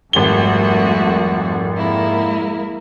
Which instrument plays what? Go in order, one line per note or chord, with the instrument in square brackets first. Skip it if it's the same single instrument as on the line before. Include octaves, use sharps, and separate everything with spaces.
[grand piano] G#1 G4 G7 [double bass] F2 [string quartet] G3 A3 F#4
[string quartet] G#3 A#3 E4